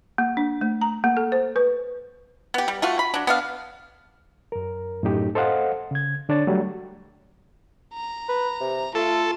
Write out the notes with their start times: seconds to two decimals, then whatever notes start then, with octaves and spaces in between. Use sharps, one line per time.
0.18 A#3
0.37 D4
0.61 A3
0.81 A#5
1.04 A#3
1.17 A4
1.32 C5
1.56 B4
2.54 B3 G4
2.68 G3
2.82 A3 F4 F#4
2.99 B5
3.14 F#3 D4
3.27 B3 D4 F5
4.52 F#2 A#4
5.03 F#2 A2 D#4 G4
5.35 A4 C5 D#5 F5 F#5
5.91 C#3 G#6
6.29 D3 D4 C#5 A6
6.47 F#3 G3 A3
7.94 A#5
8.29 B4
8.61 C3
8.95 A3 F4 A4